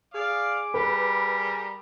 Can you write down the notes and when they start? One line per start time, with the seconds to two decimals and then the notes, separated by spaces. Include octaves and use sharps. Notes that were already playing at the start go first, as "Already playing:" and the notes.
0.14 G#4 D5 F5 D6
0.74 G3 A#4 B4